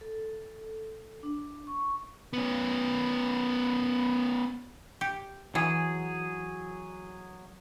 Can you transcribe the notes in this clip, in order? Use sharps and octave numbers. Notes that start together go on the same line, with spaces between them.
A4
D4
C#6
B3 C#4
G4
E3 F#3 G#4